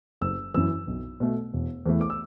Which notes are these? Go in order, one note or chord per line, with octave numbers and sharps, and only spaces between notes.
F#1 E6
F#2 E3 E6
B1
B2 A3
E1
E2 E3 A3
D6
E6